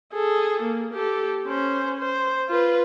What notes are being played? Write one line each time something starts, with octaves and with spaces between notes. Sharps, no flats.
G#4 A4
A#3
G4 A4
C#4 C5
C5
F4 B4